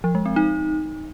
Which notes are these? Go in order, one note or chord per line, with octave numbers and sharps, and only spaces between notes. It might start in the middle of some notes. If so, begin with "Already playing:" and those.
F3
G#3
C4
D#4